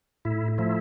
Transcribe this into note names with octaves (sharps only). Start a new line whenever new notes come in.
A2 E4
F3 A3 E4